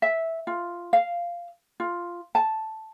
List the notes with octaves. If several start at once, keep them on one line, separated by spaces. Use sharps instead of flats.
E5
F4
F5
F4
A5